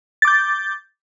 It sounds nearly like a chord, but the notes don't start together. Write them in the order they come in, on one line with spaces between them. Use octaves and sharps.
A6 D6 G6